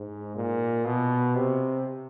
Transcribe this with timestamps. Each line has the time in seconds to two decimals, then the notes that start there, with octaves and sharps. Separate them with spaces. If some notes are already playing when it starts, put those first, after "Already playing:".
Already playing: G#2
0.36 A#2
0.85 B2
1.35 C3